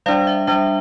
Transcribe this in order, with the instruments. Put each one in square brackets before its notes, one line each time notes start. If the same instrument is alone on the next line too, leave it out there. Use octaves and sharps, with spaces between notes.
[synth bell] G3 D4 D5 F5
E5
G3 D4 E5